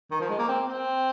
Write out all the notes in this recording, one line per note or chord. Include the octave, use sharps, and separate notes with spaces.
D#3
F3
G#3
A#3
C4
C4